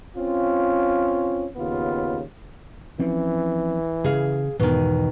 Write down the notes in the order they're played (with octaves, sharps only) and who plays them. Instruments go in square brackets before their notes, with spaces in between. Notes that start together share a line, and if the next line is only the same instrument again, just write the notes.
[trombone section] C4 C#4 F4
D#2 C#3 B3 F4
[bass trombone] E3 [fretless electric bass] F3 C4 C#4
[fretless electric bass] C#3 [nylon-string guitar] G#4 F5
[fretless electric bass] E2 G#2 E3 [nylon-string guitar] B2 D#3